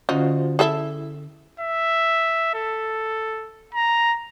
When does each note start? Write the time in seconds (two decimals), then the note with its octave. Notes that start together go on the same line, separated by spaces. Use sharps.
0.09 D3 C#4 D#4 F4 F#4 C5
0.59 E4 G#4 A4 E5
1.60 E5
2.54 A4
3.75 A#5